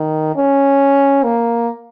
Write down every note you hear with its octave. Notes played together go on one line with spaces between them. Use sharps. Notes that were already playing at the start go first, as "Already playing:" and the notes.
Already playing: D#3
C#4
A#3